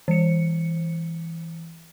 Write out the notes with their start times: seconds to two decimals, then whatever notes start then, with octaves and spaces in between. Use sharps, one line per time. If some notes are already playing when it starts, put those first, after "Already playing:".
0.08 E3 C#7